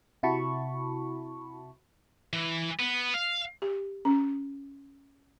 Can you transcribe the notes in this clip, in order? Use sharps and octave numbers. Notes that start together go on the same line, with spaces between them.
C3 E4 F#4 A5 B5 C#6
E3
B3
F5
G4
C#4